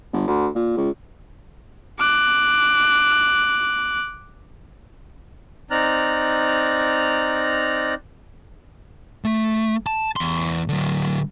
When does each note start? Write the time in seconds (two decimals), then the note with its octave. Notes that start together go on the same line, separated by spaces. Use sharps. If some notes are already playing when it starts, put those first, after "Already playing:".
0.13 G1
0.28 D2
0.55 A#2
0.77 C#2
1.99 D6 F#6
5.71 C4 D#4 D5 A#5 F6 F#6
9.25 A3
9.87 A5
10.16 E2 C6
10.68 D3 F#3